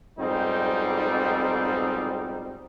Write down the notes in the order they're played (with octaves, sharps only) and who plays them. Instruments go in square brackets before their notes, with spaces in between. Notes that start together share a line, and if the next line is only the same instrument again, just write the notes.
[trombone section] B1 F2 G#2 G3 C4 D#4